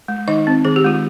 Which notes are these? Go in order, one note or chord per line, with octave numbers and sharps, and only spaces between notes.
G#3
D#3 D#4 D#5
C4
D#3 G#4
G4
G#3 F4